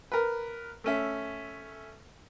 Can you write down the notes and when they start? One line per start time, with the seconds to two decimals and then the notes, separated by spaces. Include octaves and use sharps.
0.12 A#4 B4
0.84 A3 C#4 E5